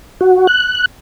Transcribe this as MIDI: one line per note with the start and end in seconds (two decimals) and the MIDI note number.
0.21 0.47 66
0.47 0.86 90